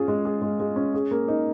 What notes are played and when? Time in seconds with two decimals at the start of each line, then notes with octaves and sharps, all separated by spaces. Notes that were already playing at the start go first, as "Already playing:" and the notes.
Already playing: C#4 F4 G#4
0.08 G#3
0.25 G#4
0.42 G#3
0.60 G#3
0.76 C#4
0.94 G#4
1.11 A#3
1.28 D#4